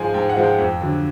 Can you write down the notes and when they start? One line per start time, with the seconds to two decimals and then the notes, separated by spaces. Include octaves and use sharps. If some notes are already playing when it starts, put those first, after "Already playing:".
Already playing: G#2 F3 G#3 G#5
0.14 G#2 G5
0.29 F#5
0.36 F3 G#3
0.43 G5
0.59 F2
0.81 D3 F#3